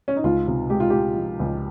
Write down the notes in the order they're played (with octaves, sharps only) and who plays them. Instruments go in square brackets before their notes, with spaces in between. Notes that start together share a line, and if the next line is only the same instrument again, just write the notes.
[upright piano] C#4
D#4
C#2 F4
C3
G#3 G4
F4
G#3 G4
F3
C#2